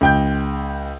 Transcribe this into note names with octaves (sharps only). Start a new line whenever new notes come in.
C#2 G5 G6